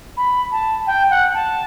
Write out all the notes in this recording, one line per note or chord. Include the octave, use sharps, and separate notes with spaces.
B5
A5
G5
F#5
A5